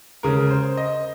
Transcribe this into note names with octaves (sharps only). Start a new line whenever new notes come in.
C#3 G#3 A#4
C5
D#5